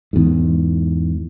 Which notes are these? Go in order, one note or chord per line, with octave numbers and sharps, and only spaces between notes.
E2 G#2